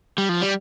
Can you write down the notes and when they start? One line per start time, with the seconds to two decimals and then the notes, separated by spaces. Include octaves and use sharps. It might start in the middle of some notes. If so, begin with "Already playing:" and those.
0.18 G3
0.29 F3
0.41 G3